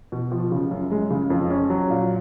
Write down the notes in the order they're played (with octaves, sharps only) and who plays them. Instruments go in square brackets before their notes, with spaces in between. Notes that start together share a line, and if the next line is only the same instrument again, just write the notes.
[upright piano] B2
F3
C#3
F#2
G#3
C#3
F2
C#4
F#3
A#2